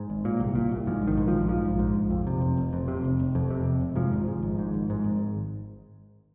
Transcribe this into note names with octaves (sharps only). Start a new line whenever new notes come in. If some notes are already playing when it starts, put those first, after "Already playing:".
Already playing: G#2
G#1
A#2
C2
A#2
C2
G#2 F3
A#1
D#3
G#2
F3
A#1
G#2 F3
A#1
G#2
A#1
F2
C3
F1
F1
F2
C3
F1
F1
F2
C3
F1
F1
G#2 F3
G#1
G#2
G#1
G#2
G#1
G#2
G#1